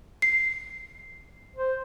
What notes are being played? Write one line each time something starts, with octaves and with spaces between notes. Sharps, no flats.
C7
C5